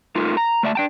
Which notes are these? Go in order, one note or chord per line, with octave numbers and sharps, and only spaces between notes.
A3 D#4 F4 A#4
A#5
A3 D5 E5 A5
D4 G5 A5